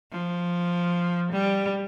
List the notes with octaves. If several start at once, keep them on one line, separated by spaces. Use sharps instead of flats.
F3
G3